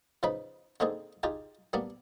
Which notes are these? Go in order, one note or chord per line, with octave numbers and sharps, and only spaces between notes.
C#3 F3 D#4 B4 B5
D3 A#3 C4 D#4 G#4
D#4 F4 G4 G#4
G3 A#3 B3 D4